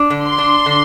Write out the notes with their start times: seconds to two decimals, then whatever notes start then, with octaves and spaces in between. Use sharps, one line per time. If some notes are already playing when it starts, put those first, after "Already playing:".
Already playing: D4
0.10 D3
0.24 C6
0.38 D4
0.66 D3